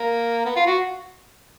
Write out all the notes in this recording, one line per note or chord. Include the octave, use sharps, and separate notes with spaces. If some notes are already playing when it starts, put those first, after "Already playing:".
Already playing: A#3
B3
F4
F#4